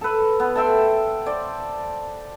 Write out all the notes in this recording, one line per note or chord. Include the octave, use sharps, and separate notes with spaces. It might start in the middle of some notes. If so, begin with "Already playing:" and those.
A4 B4
B3
A4 E5 G5 C6
C5 D5